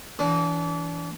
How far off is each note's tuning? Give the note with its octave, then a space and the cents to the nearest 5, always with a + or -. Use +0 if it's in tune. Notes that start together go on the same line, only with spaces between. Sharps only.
E3 +0 D4 -35